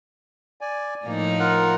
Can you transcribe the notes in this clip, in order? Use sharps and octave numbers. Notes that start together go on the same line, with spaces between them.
D5 G#5
A2 F3 A#3 D#4
F4 A#4 F#5